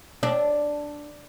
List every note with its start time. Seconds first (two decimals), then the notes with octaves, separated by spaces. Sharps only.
0.23 D4